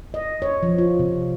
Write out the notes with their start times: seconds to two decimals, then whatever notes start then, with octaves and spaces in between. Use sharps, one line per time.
0.14 D#5
0.42 C#5
0.63 F3
0.78 F4
0.99 C3